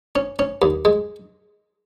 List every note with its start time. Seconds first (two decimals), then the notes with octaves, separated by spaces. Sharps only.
0.16 C#4
0.39 C#4
0.62 D#2
0.85 G#3